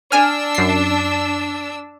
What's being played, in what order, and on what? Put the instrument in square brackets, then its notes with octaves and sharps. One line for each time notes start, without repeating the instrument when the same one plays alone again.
[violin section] D4 E6 [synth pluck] G#5 F6
[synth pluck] F#2 C7